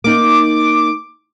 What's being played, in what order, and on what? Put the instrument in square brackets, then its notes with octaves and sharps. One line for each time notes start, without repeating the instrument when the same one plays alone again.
[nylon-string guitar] A#3 D#4 [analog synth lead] D6